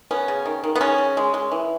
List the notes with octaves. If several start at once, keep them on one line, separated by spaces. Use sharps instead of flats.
B3 C#4
C#3
D#3
D#3
B3
C#3 C#4
C#3
G#3
G#3
E3